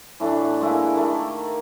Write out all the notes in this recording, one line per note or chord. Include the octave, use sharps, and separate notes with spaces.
A2 E3 A3 D4
F#5
G#3 A#3 E4
D#3 A3 A#3